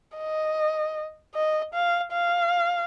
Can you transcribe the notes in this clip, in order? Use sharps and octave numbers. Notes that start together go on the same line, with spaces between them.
D#5
D#5
F5
F5